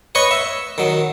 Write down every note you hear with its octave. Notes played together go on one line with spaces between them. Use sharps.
B4 C#5 D#5 C#6
E5
D#3 F#3